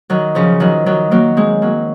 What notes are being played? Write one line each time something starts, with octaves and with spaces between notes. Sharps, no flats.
D#3 F#3
C#3 F3
D#3 F#3
D#3 F#3
F#3 A#3
G#3 C4
F#3 A#3